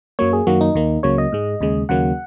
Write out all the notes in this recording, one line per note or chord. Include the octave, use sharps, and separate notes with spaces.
F#2 F#3 A#3 C#5
G#4
F#2 D#3 F#3 A#3 F#4
D#4
D#2 D#3 A#3
C#2 C#3 F#3 A#3 C#5
D#5
G#2 G#3
D#2 C#3 G#3
D#2 C#3 F#3 A#3 F#5